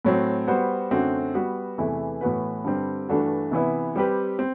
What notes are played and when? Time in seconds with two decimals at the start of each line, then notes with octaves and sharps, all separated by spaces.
0.05 A2 F#3 C4
0.47 G3 B3 F#4 C5
0.91 F#2 D3 A3 C4 F#4
1.34 G3 B3 F#4 B4
1.78 E2 C3 E3 A3 E4
2.21 A2 E3 B3 F#4 B4
2.64 G2 D3 G3 C4
3.08 G2 E3 A3 D4 F#4
3.51 C3 E3 B3 E4
3.95 G3 C4 G4 B4
4.39 C4